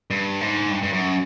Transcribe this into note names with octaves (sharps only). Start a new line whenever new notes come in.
G2
G#2
G2
G2
F#2